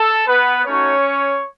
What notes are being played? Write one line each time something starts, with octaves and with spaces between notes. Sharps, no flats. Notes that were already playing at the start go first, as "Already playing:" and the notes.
Already playing: A4
B3 B4
A3 C#4 D#4 F#4 C#5